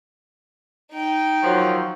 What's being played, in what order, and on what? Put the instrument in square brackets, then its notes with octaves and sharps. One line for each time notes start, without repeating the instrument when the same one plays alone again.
[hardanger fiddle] D#4 G5
[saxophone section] D#3 F3 F#3